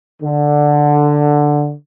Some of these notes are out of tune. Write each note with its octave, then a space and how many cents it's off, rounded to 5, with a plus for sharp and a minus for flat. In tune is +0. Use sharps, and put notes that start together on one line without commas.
D3 +5